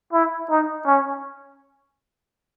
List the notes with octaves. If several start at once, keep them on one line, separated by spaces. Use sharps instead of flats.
E4
D#4
C#4